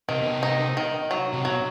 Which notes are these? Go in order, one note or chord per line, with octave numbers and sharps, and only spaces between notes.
C3 D#3
B2
C3
D#4
D#3
F#3
C3
B2 F#3